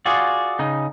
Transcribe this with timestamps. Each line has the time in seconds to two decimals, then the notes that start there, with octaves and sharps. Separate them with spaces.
0.06 F4 F#4 G#4 D5
0.59 C#3 D#4